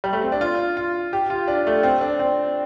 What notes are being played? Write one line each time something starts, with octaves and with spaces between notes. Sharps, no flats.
G3
A3
C4
D4
F4
F4
G4
F4
D4
A3
C4
D4
C4